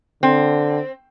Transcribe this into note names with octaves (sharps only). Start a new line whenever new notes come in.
D3 C4